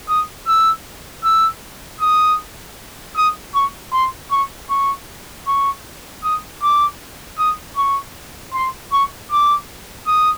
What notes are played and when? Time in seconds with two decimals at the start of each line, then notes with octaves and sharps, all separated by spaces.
0.08 D#6
0.47 E6
1.24 E6
2.00 D#6
3.16 D#6
3.54 C#6
3.93 C6
4.31 C#6
4.70 C#6
5.47 C#6
6.23 D#6
6.62 D6
7.38 D#6
7.76 C#6
8.54 C6
8.92 C#6
9.31 D6
10.07 D#6